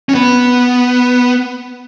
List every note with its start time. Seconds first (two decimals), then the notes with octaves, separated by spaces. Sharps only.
0.09 C#4
0.15 B3